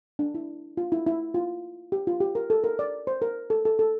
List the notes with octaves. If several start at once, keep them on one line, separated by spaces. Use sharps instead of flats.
D4
E4
F4
E4
E4
F4
G4
F4
G4
A#4
A4
A#4
D5
C5
A#4
A4
A4
A4